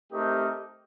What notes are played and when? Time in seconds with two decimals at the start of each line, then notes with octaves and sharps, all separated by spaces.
0.12 A3 C4 D#4 G4 A#4